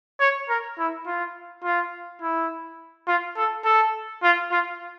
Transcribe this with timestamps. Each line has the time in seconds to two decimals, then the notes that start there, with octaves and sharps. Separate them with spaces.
0.20 C#5
0.49 A#4
0.78 E4
1.06 F4
1.64 F4
2.21 E4
3.07 F4
3.36 A4
3.65 A4
4.23 F4
4.51 F4